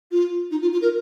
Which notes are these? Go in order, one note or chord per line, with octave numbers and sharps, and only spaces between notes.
F4
D#4
F4
F4
A#4